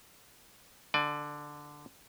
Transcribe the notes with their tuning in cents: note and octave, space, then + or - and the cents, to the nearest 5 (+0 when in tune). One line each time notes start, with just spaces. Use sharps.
D3 +0 D5 +25 G#5 +35